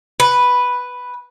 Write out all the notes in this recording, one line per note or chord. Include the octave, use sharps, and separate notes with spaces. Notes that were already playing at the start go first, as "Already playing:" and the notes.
B4